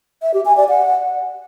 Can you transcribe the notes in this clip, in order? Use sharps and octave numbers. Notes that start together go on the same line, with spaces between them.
E5
G4
G#5
D5
F#5